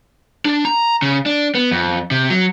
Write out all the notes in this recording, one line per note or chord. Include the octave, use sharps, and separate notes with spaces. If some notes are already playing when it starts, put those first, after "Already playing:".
D4
A#5
C#3
D4
B3
F2
C3
F#3